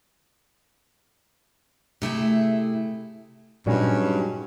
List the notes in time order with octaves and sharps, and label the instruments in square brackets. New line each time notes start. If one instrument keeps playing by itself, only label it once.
[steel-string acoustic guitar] C3 A3 E4 G#4
[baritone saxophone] G2 [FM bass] A#2 [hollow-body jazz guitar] F#3 G#3 D#4 [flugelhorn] C#4